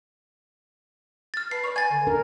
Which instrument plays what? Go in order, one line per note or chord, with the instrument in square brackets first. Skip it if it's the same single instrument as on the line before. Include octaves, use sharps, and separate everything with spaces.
[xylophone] F6 A6
[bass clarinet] B4 [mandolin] A5 [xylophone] C7
[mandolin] C#5 D5
[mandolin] G#5 [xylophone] G#6 A6
[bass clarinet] D3
[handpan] D4 A#4